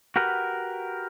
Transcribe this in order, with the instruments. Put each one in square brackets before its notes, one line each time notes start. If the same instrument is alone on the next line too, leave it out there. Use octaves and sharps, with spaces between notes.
[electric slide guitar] F#4 G4 A#4 B4 F#5